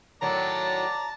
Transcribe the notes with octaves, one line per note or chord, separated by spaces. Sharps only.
A2 D#3 F#3 D4 D5 A5 A#5